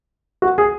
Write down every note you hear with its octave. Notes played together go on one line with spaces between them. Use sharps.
F#4
G#4